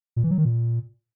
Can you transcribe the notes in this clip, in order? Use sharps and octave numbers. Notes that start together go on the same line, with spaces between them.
A#2
E3
F#3
D#3
A#2